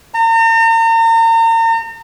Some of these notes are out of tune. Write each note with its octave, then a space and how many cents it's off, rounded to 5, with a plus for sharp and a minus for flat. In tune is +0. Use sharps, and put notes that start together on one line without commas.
A#5 -40